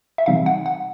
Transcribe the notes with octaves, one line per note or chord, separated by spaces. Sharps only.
E5
C3 E3 G3 C4 D#4 F5
F#5
F#5